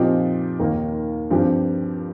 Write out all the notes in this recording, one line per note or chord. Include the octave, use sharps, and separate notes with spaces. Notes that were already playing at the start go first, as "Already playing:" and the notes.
Already playing: A#2 F3 C4 D#4 G4
D#2 D#3 A#3
G2 F3 C4 G4